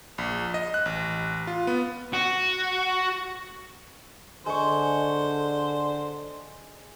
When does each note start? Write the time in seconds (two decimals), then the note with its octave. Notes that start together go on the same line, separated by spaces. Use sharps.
0.18 A#1
0.54 D#5
0.74 F#6
0.86 A1
1.47 F4
1.67 B3
2.13 F#4
4.46 D3 G#3 C5 C#6